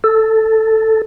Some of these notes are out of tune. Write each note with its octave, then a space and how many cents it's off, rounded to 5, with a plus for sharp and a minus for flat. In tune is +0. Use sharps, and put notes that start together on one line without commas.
A4 +5